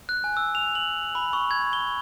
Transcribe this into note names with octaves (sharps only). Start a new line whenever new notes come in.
F#6
G#5
E6
F7
F#7
B5
C#6
G#6
G7